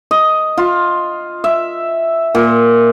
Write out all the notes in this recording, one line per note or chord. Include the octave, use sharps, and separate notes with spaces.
D#5
F4
E5
A#2